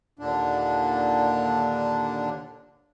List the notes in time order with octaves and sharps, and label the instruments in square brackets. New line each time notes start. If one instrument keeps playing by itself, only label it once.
[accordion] D#2 A#2 D3 D4